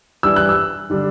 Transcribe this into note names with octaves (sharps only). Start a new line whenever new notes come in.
E3 G3 D4 E6
F#6
E6
D3 G3 D4